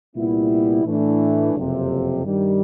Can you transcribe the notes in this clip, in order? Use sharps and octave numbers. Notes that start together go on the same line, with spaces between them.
C2 A#2 G3 B3 E4
A2 E3 A3 D4
F#1 F2 C3
G2 D#3 G3